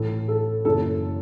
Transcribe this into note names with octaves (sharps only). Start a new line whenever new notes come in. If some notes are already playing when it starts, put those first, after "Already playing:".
Already playing: A1 A2 E3 A4
A4
F#1 F#2 E3 A4